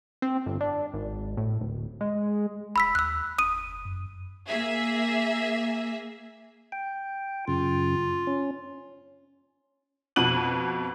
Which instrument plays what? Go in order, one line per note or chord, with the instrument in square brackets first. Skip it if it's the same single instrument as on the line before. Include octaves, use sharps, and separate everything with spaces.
[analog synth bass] C4
G1
D4
G#1
A2
D1
G#3
[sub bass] F1 [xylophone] B5 E6 B6
[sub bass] D#2 [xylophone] E6 F#6
[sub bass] F#1 [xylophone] D#6 D#7
[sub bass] F#2
[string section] A#3 G#4 E5
[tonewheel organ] G5
[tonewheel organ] F#2 C#3 [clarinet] F4
[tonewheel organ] C#4
[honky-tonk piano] F2 B2 F#6 D#7 F#7